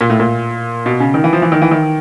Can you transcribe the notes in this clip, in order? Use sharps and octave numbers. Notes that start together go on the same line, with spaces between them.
A#2
A2
A#2
B2
C#3
D#3
E3
F3
E3
D#3
E3
D#3